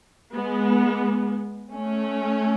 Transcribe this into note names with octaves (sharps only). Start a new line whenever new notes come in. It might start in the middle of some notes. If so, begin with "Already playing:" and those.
G#3 B3
A3 C#4